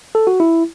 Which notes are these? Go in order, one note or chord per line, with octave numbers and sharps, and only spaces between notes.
A4
F#4
E4